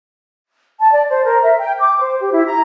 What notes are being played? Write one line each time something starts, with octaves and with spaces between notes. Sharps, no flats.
A5
D5
C5
A#4
E5
G5
D6
C5
G4
E4
A#5